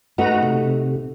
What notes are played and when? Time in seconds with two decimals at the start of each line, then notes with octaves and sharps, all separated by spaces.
0.18 A3 D#4 F#4 B4 A#5
0.43 C3